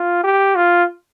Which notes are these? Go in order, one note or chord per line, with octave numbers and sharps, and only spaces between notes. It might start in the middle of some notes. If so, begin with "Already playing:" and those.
Already playing: F4
G4
F4